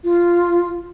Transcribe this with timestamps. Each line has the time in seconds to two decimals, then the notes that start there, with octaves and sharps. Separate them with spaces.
0.04 F4